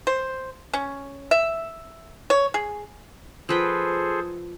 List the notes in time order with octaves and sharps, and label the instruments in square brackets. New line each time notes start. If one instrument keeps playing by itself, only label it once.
[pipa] C5
C#4
E5
C#5
G#4
[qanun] F3 B4 G5 [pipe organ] G#4 A4 C5